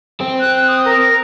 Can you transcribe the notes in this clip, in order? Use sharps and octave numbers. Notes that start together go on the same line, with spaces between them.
C4
F#6
D#6
A#4